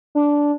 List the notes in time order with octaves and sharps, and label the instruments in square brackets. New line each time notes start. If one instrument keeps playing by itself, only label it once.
[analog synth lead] D4